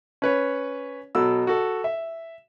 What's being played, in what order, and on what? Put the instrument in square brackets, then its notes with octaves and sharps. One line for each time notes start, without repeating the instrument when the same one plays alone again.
[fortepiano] C#4 B4 C#5
B2 F#3 A4 E6
F#4 A4
E5